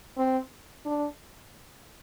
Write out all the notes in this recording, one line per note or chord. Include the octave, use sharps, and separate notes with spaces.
C4
D4